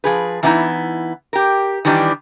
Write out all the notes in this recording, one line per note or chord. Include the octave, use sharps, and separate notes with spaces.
F3 G#4 B4
E3 A#3 B3 C#4 D#4 E4
G4 A#4
D#3 E3 G3 D4 G4 B4